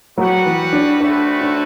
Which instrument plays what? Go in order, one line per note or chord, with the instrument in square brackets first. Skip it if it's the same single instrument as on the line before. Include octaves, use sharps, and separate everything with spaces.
[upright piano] F#3 [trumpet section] G3 B3 F#4 B4 F#5
[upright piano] E3
D4
[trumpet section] A3 C4 F#4 B4 E5 [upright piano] D4
[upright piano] D4